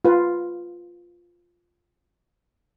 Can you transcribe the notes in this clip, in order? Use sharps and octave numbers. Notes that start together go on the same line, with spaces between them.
F4 B4